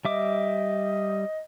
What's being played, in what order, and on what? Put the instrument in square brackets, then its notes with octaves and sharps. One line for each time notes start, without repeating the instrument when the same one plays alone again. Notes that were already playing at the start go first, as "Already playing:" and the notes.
[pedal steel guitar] G3 E5 D6 [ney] D#5